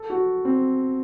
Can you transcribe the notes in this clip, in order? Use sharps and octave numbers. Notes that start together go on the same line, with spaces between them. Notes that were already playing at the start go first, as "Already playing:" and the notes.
Already playing: A4
F#4
C4